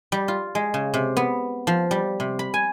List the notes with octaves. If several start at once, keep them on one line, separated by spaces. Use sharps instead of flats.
G3
F4
G#3
C#3
C3
B3
F3
G3
C3
B5
G#5